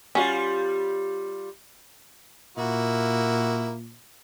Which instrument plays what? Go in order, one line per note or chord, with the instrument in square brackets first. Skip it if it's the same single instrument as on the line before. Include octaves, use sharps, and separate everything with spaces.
[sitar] G3 F4 [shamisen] C#4 F#4
[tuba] A#2 [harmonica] A#3 E4 F#4